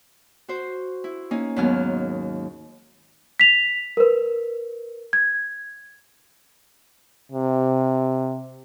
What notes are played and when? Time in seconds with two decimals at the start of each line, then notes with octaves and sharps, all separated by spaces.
0.49 F#4 C5
1.04 E4
1.31 A#3 C#4 D#4
1.56 D#2 G#2 D#3 F#3 B3 F6
3.40 B6 F7
3.97 A#4 B4
5.13 G#6
7.32 C3